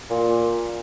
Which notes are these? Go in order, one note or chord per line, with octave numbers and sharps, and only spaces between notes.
A#2